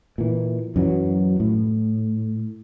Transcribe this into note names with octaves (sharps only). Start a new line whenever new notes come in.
A#2 E3
F#2 E3 F#3
A2